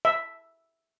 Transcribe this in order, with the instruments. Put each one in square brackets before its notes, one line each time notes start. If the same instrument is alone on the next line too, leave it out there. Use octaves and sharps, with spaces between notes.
[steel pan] E5